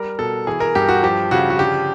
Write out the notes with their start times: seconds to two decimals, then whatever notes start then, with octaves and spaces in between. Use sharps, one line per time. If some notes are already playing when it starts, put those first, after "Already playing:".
Already playing: G3 A#4
0.19 B2 A4
0.47 E3 G#4
0.60 A#4
0.75 G2 G4
0.89 F#4
1.03 F3 G4
1.31 C#3 F#4
1.50 F#4
1.59 D3 G4